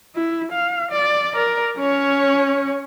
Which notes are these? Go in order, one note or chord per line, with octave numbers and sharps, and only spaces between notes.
E4
F5
D5
A#4 D5
C#4 C#5